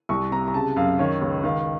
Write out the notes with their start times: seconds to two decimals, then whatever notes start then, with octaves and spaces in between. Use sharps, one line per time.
0.09 C2 C#6
0.31 C3 A#5
0.48 A#5
0.54 C#3 A5
0.76 F#2 F5
0.99 D#3 C#5
1.21 C#2 C#5
1.44 D#3 F5